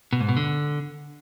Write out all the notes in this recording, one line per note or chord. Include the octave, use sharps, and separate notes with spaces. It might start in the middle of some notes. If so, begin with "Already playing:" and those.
B2
G#2
B2
D3